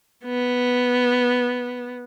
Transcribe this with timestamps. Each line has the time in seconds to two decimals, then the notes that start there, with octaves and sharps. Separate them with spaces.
0.25 B3